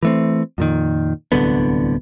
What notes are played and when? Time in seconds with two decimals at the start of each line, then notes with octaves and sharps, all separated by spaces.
0.03 E3 A3 C4
0.58 F2 A#2 D#3
1.32 D1 C2 D3 B3